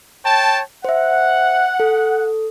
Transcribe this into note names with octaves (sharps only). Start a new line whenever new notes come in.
C#5 G5 A5
C5 E5 F#5
A4